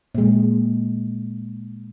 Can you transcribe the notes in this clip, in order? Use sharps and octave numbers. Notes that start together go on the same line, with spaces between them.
A#2 G#3